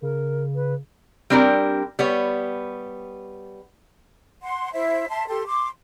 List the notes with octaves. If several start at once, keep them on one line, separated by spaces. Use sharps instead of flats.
C#3 A#4
B4
G3 C4 D4 G4 A#4
G3 B3 C#5
F#5 C6
E4 C5 E5
E5 A5 C6
G4 A4 C6
C6 D6